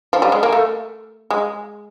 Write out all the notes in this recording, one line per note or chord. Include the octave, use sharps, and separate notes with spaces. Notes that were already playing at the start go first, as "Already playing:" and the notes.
F3
G3
G#3
A#3
A3
G#3